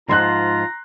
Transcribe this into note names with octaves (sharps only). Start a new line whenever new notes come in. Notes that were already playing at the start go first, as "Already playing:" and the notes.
G#2 F3 F4 A#5 C6 F#6